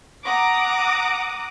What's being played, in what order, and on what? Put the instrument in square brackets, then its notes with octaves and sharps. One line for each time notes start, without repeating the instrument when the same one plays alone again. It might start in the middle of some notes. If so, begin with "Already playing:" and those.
[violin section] F#5 A#5 D6 D#6